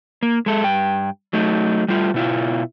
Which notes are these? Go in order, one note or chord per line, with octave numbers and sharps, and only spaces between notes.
A#3
G#3 A4
G2 G5
F#3 A3 D#4
G3 A3 F4
B2 E4 F4